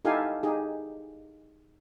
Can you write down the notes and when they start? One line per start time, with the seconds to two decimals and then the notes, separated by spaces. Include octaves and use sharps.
0.05 D#4 E4 G4 A4 F5 G#5
0.43 D#4 G4 G#4